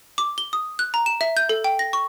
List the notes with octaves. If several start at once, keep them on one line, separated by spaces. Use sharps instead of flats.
D6
G7
D#6
F#6
A#5
E7
E5
G6
A4
G5
A#6
C#6